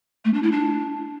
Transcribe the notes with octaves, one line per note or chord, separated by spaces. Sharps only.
A3
D4
E4
D4